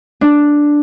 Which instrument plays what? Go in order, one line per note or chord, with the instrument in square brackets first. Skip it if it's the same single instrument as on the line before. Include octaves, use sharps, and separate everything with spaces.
[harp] D4